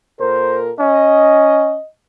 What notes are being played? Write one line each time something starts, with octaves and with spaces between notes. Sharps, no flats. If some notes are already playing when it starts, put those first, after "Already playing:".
A#2 A4 A#4 C5
C#4 D#5